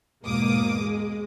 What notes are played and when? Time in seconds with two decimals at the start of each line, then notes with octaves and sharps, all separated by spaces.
0.24 E2 G#2 B2 A#3 D6 D#6
0.80 G#3